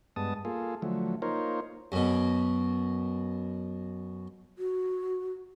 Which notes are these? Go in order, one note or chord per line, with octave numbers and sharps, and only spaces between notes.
G2 G#3 B3 A5 D#6
A#3 F4 G#4 A4
D3 F3 F#3 A3
A#3 D#4 F4 A#4 C5 C#5
F#2 B2
F#4